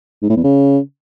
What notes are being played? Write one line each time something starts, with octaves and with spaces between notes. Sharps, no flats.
G#2
A2
E2
C#3